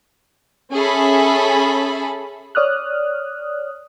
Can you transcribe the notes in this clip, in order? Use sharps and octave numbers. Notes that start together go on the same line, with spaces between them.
C#4 G#4 A4 E5 B5
C#5 D5 D#6 F6 F#6